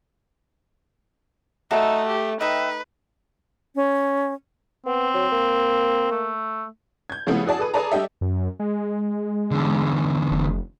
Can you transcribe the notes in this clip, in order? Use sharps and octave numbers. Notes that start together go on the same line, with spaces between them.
A3 D#4 F#4 A4 E5
G4
D#4 B4 D#5 E5 G5
C#4
B3 C4
F#3
A#3
A3
G6 G#6
C#3 F3 G3 A3 B3 E4
E4 F#4 G#4 D5 A5
G#4 A4 B4
G#4 A4 B4 D5 A5 A#5
G3 D4 G4 A4 D#5 E5
F#2
G#3
E2 D3
F1